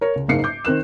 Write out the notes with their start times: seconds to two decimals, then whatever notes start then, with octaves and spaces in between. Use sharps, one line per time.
0.01 A#4 C#5
0.16 C#2
0.28 F#1 G#2 A#3 C7 C#7
0.44 D6 G6
0.65 D#3 C4 A#4 F#6 E7